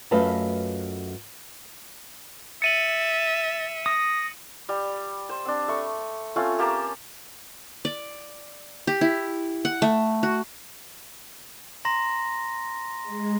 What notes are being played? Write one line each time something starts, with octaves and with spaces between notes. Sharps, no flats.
F#2 A3 F4 B4 D#5 A5
E5 A6 C#7 D#7 F#7
D#6 A#6
G3
C5
C4 D4
A3 B5 C#6
A3 C4 C#4 F4
A#3 G4 A5 A#5
D5
G4
E4
F#5
A3
F#4
A#5 C6 A#6
G#3